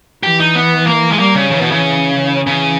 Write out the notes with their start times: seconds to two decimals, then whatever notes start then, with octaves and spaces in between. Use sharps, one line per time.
0.23 E3 G4
0.40 D#4
0.55 B3
0.87 A#3
1.12 G#3
1.19 G3 A#3
1.35 C#3
1.51 C#3 E3
1.61 B2
1.71 C#3
2.15 E3
2.47 C#3 E3